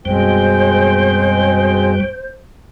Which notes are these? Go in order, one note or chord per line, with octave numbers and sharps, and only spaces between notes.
F#2 B2 G3 G#3 C4 C5